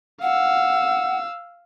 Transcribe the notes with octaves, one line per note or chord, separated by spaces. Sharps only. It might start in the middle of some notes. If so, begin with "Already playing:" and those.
F5 F#5 E6